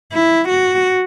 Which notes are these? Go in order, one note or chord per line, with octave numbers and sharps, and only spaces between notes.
E4
F#4